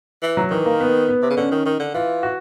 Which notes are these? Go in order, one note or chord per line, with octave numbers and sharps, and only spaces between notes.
E3
F#3
D#3 E3
A#3
B3
B3
C3
C#3
D3 C#4
D#3
D#3
D3
E3 F4
F#4